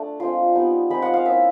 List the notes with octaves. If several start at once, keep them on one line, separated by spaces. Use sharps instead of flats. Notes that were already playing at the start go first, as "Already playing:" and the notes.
Already playing: A3 D4
G#3 C4 F4 C6
G3 B3 D#4
F3 G#3 C4 D#4 B5
F#5
F5
A#3 C#4 E4 E5